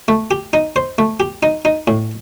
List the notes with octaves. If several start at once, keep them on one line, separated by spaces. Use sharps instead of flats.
A3
G4
D#4
C5
A3
G4
D#4
D#4
A2